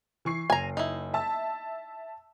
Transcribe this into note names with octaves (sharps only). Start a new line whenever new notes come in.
E3 C#6 C7
F#1 G#5 A#5
D#4 E4
E5 A5 E6